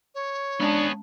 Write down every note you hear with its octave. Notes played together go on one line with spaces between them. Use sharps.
C#5
G#3 B3 C#4 D4 G#4 A5